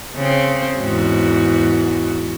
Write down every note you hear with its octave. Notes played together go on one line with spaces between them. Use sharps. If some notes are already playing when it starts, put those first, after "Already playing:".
C#3 C4
E2 G#2 F#4